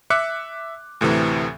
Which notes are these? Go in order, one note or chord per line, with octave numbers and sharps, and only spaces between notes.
E5 D6 F#6 C#7
D2 A2 C3 E3